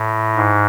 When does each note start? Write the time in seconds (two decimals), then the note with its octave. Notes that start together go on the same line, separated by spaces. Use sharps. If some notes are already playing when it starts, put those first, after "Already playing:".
Already playing: A2
0.36 G#2